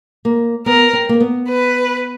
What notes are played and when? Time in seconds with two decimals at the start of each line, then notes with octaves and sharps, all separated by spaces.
0.25 A#3
0.66 B3 A#4
0.93 C4
1.09 A#3
1.20 B3
1.48 B4